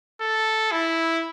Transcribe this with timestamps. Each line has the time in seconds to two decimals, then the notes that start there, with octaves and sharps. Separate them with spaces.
0.21 A4
0.72 E4